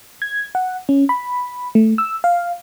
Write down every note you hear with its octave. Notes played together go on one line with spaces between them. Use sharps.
G#6
F#5
C#4
B5
A3
E6
F5